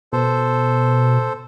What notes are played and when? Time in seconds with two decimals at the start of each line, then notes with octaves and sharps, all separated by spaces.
0.13 B2 A4 C5